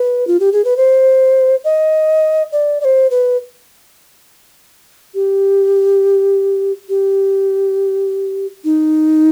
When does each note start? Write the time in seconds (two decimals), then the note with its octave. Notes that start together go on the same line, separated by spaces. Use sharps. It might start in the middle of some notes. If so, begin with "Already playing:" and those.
Already playing: B4
0.27 F4
0.40 G4
0.53 G#4
0.65 B4
0.77 C5
1.64 D#5
2.52 D5
2.81 D5
2.85 C5
3.11 B4
5.15 G4
6.89 G4
8.64 D#4